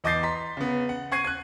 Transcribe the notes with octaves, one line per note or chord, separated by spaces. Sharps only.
E2 D#5 D6 G6 A6 C7
A#5 C6 B6
C#3 B3
F#5
F#5 C#6 G#6 C7 D#7
F#6 G#6